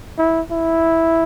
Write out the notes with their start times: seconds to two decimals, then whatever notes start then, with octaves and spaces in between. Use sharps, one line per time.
0.18 E4
0.52 E4